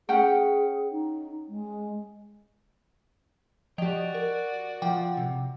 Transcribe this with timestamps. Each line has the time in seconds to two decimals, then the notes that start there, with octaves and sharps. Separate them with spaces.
0.09 C#4 G#4 F#5 G5
0.92 D#4
1.49 G#3
3.78 F3 F#4 G4 D5 D#5 G5 F7
4.14 A#4
4.82 F3 F#5 G5 D6
5.17 C3